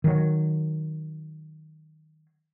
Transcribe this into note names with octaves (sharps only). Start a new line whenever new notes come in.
D#3 F#3